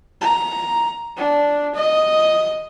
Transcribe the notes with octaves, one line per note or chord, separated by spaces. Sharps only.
A#5
D4
D#5